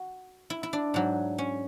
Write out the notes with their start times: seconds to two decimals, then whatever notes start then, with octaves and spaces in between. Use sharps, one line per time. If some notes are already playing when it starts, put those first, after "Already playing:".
Already playing: F#4
0.50 E4
0.63 E4
0.73 D4
0.94 G#2 F#3
1.38 C#4